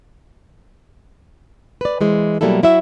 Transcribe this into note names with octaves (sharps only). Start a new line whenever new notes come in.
B4 D5
E3 G#3 C5
B2 F#3 G3 A#3 E4 A4
F#3 E4 F#4 E5